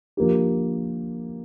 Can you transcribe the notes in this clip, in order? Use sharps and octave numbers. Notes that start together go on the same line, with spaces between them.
F3 A#3 D4 G4